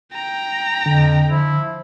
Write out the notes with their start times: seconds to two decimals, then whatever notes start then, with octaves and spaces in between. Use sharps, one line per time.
0.14 G5 A#5
0.86 F2 D3
1.29 F3 E4